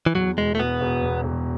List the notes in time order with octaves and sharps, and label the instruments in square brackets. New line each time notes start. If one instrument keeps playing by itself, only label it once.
[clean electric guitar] E3
[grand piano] E2 [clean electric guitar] F#3
[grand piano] E1 [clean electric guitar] G#3
[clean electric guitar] A3
[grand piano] B2 [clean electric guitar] B3
[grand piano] E1
E2
E1